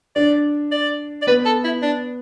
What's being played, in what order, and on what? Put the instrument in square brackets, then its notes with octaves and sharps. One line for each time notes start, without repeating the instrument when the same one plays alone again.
[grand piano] D4 [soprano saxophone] D5
[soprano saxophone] D5
D5
[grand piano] B3 [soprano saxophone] B4
[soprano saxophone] A4
E4
D4